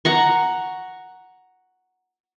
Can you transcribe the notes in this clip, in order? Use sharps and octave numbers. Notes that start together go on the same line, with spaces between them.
F#5 A#5 C#6